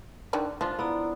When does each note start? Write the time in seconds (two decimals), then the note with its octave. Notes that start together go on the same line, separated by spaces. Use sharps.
0.33 D3 D#3 D4
0.61 F3 D4 F4
0.79 B3 E4 D5 A#5